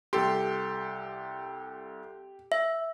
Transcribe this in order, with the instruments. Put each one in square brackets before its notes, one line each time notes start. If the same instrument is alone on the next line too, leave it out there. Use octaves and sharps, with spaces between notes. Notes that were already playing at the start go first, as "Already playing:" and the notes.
[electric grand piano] C2 A4 C6 [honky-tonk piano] G4
[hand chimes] E5